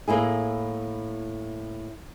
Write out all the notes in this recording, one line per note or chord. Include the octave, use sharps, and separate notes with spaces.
A2 A#3 E4 G#4